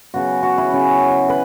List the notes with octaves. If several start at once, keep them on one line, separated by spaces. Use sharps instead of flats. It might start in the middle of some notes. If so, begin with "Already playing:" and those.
C#3 F#3 B3 F#4
F#4
E4
C#3 F#3 C#4
B4